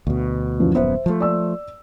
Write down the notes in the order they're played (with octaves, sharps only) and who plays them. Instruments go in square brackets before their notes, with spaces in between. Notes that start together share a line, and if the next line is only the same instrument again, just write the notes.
[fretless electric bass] D2 B2
[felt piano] F#2 E3 F3
[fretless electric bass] D#1 F#2 B3 [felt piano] C5 E5
[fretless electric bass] F3 A3
[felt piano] D5 E6